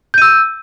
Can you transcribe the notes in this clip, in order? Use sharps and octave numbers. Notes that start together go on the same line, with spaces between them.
E6 G6 D#7